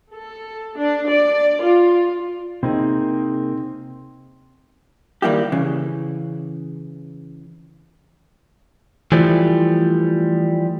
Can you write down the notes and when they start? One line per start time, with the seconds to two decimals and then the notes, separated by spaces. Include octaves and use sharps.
0.15 A4
0.79 D4
1.09 D5
1.63 F4
2.63 C3 A#3 C4 D#4 G#4
5.22 D#2 G3 A#3 E4 G4
5.52 C#3 E3
9.12 E3 F3 G3 A3